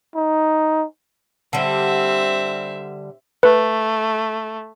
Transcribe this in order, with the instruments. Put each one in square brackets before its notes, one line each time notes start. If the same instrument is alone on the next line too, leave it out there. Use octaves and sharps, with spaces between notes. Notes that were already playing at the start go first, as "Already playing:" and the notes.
[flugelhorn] D#4
[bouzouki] D3 G3 [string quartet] C4 E5
[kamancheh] A3 [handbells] B4